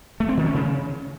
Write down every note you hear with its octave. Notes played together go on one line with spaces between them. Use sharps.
A3
C4
D#3
C#4
C#3